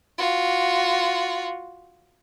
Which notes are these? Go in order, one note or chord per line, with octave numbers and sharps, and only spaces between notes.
F4 F#4